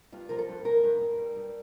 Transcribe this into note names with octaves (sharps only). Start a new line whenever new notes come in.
G2 F4
F3 A#4
A4
G2
G2 A#4
G2
G2
G3
G2